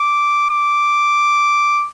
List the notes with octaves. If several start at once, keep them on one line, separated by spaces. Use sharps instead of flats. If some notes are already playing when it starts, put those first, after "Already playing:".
Already playing: D6
D6